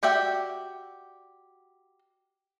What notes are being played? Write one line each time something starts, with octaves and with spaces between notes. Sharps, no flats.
F#4 G4 D5 E5 G5